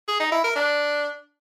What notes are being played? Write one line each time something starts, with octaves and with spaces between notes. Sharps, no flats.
G#4
D#4
E4
A#4
D4